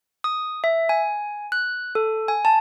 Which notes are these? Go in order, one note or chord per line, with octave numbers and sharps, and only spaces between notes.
D#6
E5
G#5
F#6
A4
G#5
A5